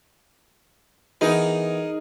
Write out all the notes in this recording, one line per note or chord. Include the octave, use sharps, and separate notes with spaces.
E3 B3 D#4 G#4 A#4